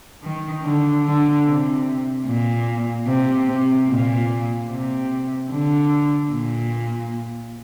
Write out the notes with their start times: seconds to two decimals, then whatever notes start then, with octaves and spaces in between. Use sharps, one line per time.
0.24 D#3
0.64 D3
1.05 D3
1.45 C3
2.26 A#2
3.07 C3
3.48 C3
3.89 A#2
4.69 C3
5.51 D3
6.32 A#2